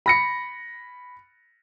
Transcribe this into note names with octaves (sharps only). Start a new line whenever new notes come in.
B5 A#6 C#7